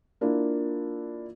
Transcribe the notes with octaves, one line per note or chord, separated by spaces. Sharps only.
A#3 D4 E4 F4